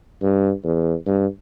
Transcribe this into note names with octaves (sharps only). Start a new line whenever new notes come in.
G2
E2
G2